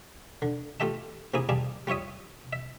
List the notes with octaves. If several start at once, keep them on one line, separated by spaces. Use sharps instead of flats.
D3
A3 F4 G4 E5 A5
C3 A#3 E4 G#4 D#6
G3 G#4 D5 F5 A5
G3 F4 C#5 E5 D#6
E5